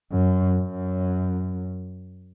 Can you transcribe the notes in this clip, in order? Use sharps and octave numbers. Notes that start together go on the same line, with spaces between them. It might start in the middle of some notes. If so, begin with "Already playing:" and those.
F#2
F#2